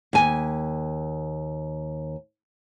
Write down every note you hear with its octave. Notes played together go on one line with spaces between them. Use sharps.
D#2 G#5